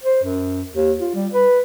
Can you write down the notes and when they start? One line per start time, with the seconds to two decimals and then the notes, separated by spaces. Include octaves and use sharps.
0.03 C5
0.23 F#2
0.74 D#2
0.99 F4
1.14 G3
1.33 B4